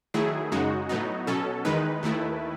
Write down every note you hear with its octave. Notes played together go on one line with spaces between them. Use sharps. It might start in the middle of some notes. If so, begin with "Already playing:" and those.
D#3 F#3 A3 E4 G#4
F#2 C#3 G#3 D#4 F#4
A2 F#3 B3 D#4
B2 F#3 C#4 A4
E2 D#3 G#3 D#4 B4
D#2 D#3 A3 E4